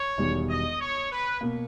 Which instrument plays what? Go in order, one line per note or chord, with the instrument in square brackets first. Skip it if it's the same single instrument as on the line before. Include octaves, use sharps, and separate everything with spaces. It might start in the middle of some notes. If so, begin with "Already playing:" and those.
Already playing: [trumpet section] C#5
[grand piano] E1 E2 D#3 G3
[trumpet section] D#5
C#5
B4
[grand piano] B2 A#3